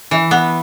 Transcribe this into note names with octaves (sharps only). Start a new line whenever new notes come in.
E3
B3